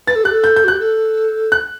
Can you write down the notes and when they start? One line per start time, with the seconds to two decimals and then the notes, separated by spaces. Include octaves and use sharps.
0.07 B4 A6
0.15 A4
0.24 G4 F#6
0.31 A4
0.44 G6
0.56 G6
0.64 F#4
0.68 G4 F#6
0.80 A4
1.52 F#6